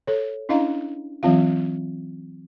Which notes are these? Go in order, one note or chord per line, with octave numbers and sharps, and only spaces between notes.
A4 C#5
C#4 D4 E4 D#5 F5 A#5
E3 F#3 C4 F4 F5